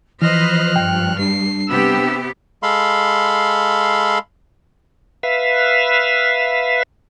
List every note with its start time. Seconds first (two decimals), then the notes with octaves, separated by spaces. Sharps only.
0.22 E3 F3 B4 C5 D#5 F6 F#6
0.76 G2 G5
1.19 G3 D4 C7
1.68 C3 B3 G4 E6
2.63 G#3 A4 F5 B5 C6
5.23 B4 E5 F5